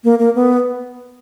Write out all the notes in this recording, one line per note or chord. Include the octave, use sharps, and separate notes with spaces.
A#3
A#3
B3